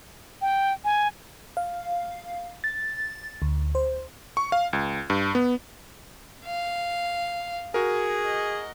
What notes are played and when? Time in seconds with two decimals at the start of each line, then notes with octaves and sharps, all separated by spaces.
0.41 G5
0.85 G#5
1.57 F5
2.64 A6
3.42 D2
3.75 C5
4.37 C#6
4.52 F5
4.73 C#2
5.10 G2
5.35 B3
6.45 F5
7.74 F#4 G#4 A#4
8.25 D#5